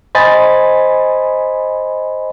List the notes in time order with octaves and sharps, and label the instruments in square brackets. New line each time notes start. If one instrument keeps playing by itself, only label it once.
[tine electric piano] C5 D#5 G#5 B5 A6